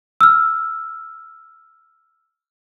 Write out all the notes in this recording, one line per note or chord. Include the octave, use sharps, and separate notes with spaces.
E6 F6